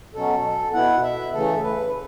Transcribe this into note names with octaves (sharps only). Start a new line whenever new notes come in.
B2 F#3 C#4 A4
B2 B3 E4 F#5
E5
C#3 E3 A3 A4
B4